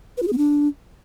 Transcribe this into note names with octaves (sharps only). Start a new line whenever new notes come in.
B4
F4
G#4
B3
D4